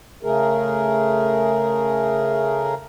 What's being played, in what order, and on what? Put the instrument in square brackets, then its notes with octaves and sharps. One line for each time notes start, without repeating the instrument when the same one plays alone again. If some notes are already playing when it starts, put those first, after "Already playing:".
[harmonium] C#3 A3 G#4 A#4